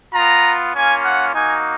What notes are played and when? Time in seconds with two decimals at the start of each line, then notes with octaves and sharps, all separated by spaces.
0.14 B3 F4 A#5
0.74 A#3 C#4 F4 G#5
1.05 F#5
1.34 A#3 D#4 F#4 G#5